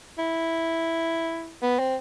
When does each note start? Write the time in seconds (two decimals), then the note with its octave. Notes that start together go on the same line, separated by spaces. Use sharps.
0.18 E4
1.62 B3
1.79 C4